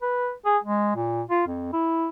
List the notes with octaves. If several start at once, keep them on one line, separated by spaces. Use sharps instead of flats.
B4
G#4
G#3
A#2
F4
F2
E4